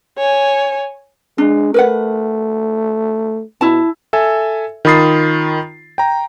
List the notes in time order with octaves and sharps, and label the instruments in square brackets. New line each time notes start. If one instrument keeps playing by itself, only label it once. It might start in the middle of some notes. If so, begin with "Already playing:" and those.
[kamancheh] C#5 G#5
[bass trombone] G#3 [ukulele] D4
[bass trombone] A3 [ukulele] A#4 B4 F#5
[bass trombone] B2 [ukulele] E4 A5
[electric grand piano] A4 E5 G#5
D#3 F4 B5 D#6 A6 C7
G5 A#5